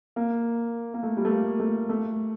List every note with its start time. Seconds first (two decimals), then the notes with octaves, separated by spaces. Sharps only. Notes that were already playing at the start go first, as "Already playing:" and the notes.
0.16 A#3
0.94 A#3
1.03 A3
1.17 G3
1.25 A3
1.31 A#3
1.60 A3
1.89 A3